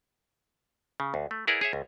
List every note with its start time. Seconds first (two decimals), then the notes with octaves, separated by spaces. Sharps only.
1.00 C#3
1.14 D2
1.31 A3
1.47 E4 G#4 A#4 B4 D5 F#5
1.61 G#4 C#5 E5
1.73 C#2